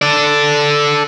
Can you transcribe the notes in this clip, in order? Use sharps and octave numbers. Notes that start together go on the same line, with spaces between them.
A4 D5